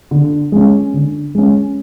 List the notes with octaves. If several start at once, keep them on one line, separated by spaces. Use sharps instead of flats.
D3
G#3 C#4
D3
G#3 C#4